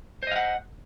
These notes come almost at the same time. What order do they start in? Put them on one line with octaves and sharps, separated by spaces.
C5 D#5 F5 F#5